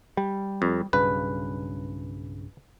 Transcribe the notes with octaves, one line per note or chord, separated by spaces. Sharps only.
G3
F2
B1 G2 C#3 B4